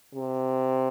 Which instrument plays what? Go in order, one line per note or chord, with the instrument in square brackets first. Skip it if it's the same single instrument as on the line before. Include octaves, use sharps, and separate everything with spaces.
[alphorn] C3